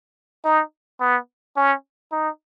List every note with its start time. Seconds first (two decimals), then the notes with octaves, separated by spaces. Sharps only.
0.45 D#4
1.00 B3
1.56 C#4
2.12 D#4